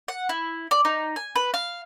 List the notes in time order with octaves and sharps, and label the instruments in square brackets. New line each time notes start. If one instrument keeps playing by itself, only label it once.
[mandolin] F#5
E4
D5
D#4
G#5
B4
F5